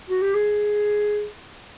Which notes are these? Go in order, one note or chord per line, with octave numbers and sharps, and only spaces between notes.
F#4
G4
G#4